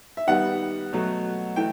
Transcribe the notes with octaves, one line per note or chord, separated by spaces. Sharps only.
E5
D#3 G3 B3 F#5
B2 F#3 A3
E3 A3 G5